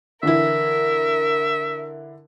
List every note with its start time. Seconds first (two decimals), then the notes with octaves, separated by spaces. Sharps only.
0.23 D3 E3 E4 A#4 E5